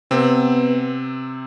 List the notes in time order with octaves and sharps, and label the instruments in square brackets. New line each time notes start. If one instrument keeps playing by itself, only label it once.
[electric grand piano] C3 C4 [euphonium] B3